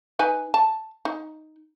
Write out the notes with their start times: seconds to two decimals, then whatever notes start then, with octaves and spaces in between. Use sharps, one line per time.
0.19 D#4 B4 G#5
0.54 A5
1.05 D#4